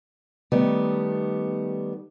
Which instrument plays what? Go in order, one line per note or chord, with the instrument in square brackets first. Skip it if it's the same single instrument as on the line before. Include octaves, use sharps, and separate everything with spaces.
[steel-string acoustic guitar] D#3 G3 A3 B3